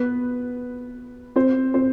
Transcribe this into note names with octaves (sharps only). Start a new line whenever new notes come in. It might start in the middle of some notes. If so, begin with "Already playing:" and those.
Already playing: B3 B4
C4 C5
C4 C5